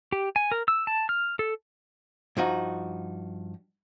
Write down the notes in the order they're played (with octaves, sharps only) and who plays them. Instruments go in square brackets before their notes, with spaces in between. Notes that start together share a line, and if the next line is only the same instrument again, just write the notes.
[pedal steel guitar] G4
G#5
A#4
E6
A5
F6
A4
[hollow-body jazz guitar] G2 F3 D#4 F#4